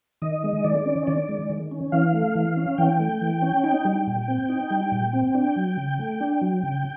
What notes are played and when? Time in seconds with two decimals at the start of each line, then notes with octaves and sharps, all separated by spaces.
0.22 D#3 D#5
0.44 G#3
0.64 D#3 D5
0.86 C#4
1.07 D#3 D5
1.29 G#3
1.49 D#3
1.71 C#4
1.92 E3 F5
2.14 A3
2.35 E3
2.57 C#4
2.78 E3 G5
2.99 A3
3.21 E3
3.42 C#4
3.63 D#4 G5
3.85 G3
4.07 A#2
4.28 C4
4.49 D#4
4.70 G3
4.92 A#2
5.13 C4
5.35 D4
5.56 F#3
5.77 C#3
5.99 A3
6.20 D4
6.41 F#3
6.63 C#3